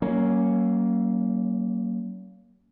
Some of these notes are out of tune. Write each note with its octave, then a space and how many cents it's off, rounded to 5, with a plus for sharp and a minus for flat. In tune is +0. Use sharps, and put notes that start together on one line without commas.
F#3 +40 A#3 +0 C#4 +0